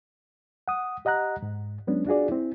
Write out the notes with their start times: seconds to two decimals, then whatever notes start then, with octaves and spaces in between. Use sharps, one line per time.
0.68 F#5 D#6
1.05 G4 D#5 F#5 A#5 F#6
1.42 G#2
1.87 F#3 G#3 B3 C#4 D4
2.06 D4 F4 F#4 G#4 D5
2.29 C4 E4